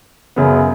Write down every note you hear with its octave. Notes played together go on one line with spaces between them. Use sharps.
F#2 C#3 B3